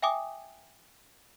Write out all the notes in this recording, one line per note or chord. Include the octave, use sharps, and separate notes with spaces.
E5 G5 G#5 D6 D#6